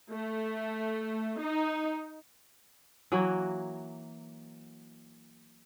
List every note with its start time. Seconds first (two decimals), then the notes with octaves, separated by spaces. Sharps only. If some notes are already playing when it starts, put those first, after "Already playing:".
0.12 A3
1.41 D#4
3.12 E3 F#3 A#3 F#4